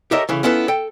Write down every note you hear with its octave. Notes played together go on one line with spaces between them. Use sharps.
G4 A4 A#4 C#5 D#5 E5
C#3 E3 A3
B3 C#4 E4 F4 A4 B4
A4 G5